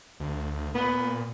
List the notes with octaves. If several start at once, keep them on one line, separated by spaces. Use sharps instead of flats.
D2
A#2 B3